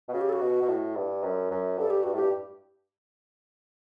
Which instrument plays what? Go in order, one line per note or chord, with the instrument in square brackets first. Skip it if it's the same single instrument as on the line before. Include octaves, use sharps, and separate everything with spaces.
[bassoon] B2
[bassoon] C#3 [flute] F#4
[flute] G4
A4
F#4
[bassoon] B2
B2
A2
G2
F#2
F#2
[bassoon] G2 [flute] A4
[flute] G4
[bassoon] G2 [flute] F#4
[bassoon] A2 [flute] G4
[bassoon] G2